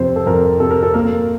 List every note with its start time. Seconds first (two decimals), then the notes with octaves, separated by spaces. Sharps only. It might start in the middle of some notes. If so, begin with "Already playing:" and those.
Already playing: F2 C3 C5
0.16 A4
0.26 F2 A#4
0.60 C3 A4
0.71 A#4
0.83 A4
0.94 A#3 A#4